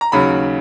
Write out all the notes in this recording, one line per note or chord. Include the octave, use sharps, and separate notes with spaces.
A#5
D#2 C#3 F#3 B5